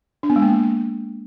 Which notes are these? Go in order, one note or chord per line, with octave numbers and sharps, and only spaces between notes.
D4
B3
G#3
A#3